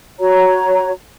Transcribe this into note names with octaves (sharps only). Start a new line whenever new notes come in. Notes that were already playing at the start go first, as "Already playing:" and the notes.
F#4 C#5 A#5